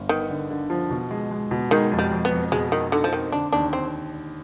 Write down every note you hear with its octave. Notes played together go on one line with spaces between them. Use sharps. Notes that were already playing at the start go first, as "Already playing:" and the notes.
Already playing: G1
D#3 B3
D3
D3
F3
B2
G#3
G#3
B2
D#3 G#3
F2
G3
F2
B3
F2
B2 G#3
D#3 D#4
D3 D#4
F3
D#3 C4
D3 D4
D#2 D4
C4